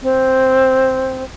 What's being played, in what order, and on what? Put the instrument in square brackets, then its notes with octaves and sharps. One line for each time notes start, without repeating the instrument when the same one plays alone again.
[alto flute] C4